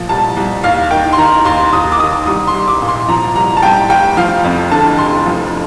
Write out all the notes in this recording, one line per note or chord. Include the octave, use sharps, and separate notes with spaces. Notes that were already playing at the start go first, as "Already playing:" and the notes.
Already playing: A#2 F3
C2 A5
C2
D#2 F5
D#3 G5
C6
D#3 A#5
D#2 C6
D#2 D#6
D6
D#3 D#6
C2 D#6
C6
C2
D6
A#2
C6
F3 A#5
C2 A#5
A5
C2 G5
F1 G5
F3 F5
F2
D3 A5
F1 C6
F3